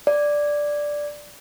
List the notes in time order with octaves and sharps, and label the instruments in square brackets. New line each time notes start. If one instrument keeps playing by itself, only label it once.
[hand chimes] D5